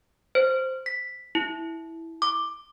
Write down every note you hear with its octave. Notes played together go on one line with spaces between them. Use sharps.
C5
B6
E4
D6